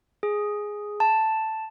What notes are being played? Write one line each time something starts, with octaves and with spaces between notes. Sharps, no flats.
G#4
A5